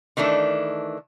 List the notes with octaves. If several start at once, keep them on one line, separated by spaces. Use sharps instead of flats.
D#3 E3 A3 D4